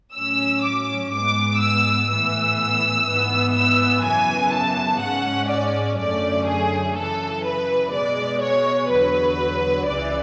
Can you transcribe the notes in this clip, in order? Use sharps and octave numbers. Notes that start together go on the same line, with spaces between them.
A2 F#3 C#4 E6
D6
G#2 G#3 B3 D6
E6
A2 E3 B3 E6
G#2 E3 B3
E6
F#2 C#3 E3 B3 G#5
A5
G#2 G#3 C#4 F#5
D5
F#2 D3 A3 C#4 D5
G#4
F#2 C#3 E3 A4
B4
B2 G#3 B3 D5
C#5
E2 D3 F#3 B4
C#2 C#3 E3 D5